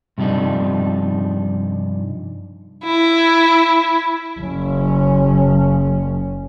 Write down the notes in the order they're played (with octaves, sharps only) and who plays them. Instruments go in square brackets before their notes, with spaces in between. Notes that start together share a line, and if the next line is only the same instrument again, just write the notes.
[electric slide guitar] G2 C3 F3 D4 D#4
[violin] E4
[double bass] F#1 C#4